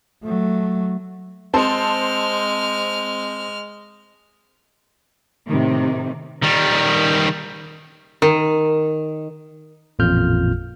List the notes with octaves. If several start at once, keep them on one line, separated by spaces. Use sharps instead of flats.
F#3 A3
G#3 C4 A5 C6 F6
A2 C3 D#3
D#3 G3
D#3
A1 F2 A#2 F4 F6 G6